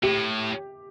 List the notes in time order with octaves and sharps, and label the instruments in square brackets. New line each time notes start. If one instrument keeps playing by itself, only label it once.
[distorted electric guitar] A2 [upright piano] G4